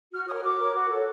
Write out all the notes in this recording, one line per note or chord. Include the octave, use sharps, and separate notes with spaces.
F#4 F6
A#4 C#5 D#6
F#4 D6
A#4 C#5
F#4
A4 C#5